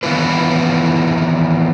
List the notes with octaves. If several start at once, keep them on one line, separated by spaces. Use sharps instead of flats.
D#3 E3 B3 E4 F4 B4